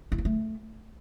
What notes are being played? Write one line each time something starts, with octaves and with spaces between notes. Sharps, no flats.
E4
A#3
A3